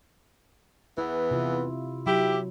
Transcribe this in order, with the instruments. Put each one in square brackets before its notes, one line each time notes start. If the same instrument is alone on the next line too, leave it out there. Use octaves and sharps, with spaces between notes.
[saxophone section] E2 E3 B3 [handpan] E4
[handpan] C3 E4 F4
[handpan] F#3 [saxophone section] E4 G4